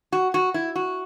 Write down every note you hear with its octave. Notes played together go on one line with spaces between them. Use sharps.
F#4
F#4
E4
F#4